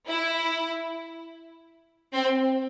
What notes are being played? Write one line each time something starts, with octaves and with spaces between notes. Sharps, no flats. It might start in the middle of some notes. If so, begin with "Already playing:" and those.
E4
C4